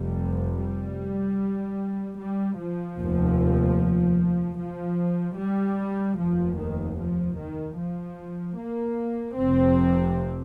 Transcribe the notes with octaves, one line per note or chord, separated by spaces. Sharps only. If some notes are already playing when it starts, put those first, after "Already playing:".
Already playing: F1 F2 C3 G3
G3
G3
F3
F1 D#2
F3
G3
F1 D#2 F3
D#3
F3
D#3
F3
A#3
F1 F2 C3 C4